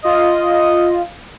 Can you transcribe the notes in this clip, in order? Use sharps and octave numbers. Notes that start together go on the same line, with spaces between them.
F4 D#5